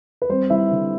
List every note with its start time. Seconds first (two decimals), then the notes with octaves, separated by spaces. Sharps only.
0.22 B4
0.29 G3 C4 C5
0.50 G3 E4 E5
0.71 D3